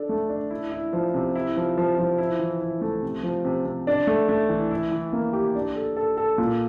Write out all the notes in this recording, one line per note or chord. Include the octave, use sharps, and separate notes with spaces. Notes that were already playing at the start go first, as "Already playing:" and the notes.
Already playing: D4 A4
A3
D4
E4
E4
F3
C3
E4
F3
F3
F3
E4
E3
E4
A3
C3
F3
C3
C3
D4
A3
A3
E3
E4
E3
A#3
G4
D4
A4
A4
A4
A#2